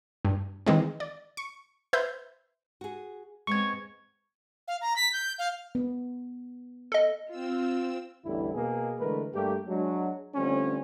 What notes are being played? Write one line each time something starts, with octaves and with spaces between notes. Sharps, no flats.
G2
D#3 E3 G#3 C4
D5
C#6
B4 C5 E5 G6
F#4 G#4
G#3 B3 C4 C#6 G#6
F5
A#5
B6
G6
F5
B3
A4 D#5
C4 F4 E6
A1 E2 D3 G3 E4
B2 A#3 G#4
D3 E3 G#3 A3 A#4 B4
G2 G3 A3 A#3 G4
F#3 G#3 D4
D3 F3 G3 A3 C4 C#4